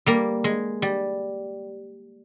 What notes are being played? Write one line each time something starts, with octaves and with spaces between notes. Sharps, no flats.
G3 A#3
G#3
G3